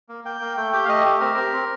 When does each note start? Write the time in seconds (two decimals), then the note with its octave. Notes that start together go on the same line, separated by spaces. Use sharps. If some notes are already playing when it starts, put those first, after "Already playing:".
0.09 A#3
0.24 A#3 G5
0.41 A#3
0.57 A3 G5
0.73 G4 G5
0.85 F5
0.89 A3 D#5
1.05 G4
1.20 C4 A#4
1.37 G4
1.53 C4